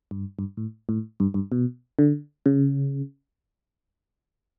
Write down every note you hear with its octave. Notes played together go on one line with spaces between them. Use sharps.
G2
G2
A2
A2
G2
G2
B2
D3
C#3